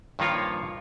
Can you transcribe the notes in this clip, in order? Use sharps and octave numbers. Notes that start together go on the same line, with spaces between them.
G2 D#3 F3 A#3 F4 C#5